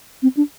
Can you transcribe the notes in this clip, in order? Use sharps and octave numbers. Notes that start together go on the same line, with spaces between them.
C4
D4